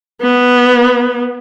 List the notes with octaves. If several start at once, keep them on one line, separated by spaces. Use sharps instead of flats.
B3